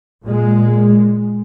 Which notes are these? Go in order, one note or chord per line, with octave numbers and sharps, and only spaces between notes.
A#2 G#3